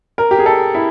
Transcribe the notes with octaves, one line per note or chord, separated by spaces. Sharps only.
A#4
G4
G#4
A4
E4